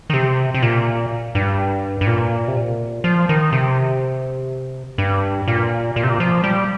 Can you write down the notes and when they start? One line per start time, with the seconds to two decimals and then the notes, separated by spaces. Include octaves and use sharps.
0.10 D#3
0.14 C3
0.54 C3
0.62 A#2
1.35 G2
2.01 G2
2.07 A#2
2.48 C3
2.57 A#2
3.04 F3
3.29 D#3
3.53 C3
4.98 G2
5.48 A#2
5.96 A#2
6.03 C3
6.09 A#2
6.20 F3
6.44 G3